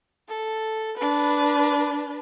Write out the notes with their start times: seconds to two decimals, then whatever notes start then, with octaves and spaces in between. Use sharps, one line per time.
0.29 A4
0.98 D4 B4